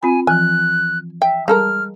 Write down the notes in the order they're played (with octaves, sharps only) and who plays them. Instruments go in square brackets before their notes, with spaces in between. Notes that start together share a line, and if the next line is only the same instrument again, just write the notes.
[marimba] C4 F4 B5 [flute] G#5
[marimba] E3 F3 [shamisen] G#5 [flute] F#6
[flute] E5 [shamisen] G5
[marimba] G3 [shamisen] G#3 A4 A#4 [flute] F6